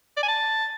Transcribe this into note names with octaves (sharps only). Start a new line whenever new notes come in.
D5
G#5
A5